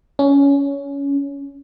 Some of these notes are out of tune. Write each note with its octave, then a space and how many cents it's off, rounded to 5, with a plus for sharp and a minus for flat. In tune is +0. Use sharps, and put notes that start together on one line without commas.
C#4 +15